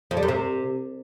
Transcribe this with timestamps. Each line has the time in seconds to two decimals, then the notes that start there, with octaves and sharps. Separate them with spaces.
0.11 F2
0.17 G3
0.23 F#2
0.28 C3